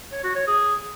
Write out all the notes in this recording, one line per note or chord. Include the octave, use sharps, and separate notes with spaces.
C#5
F#4
C#5
G#4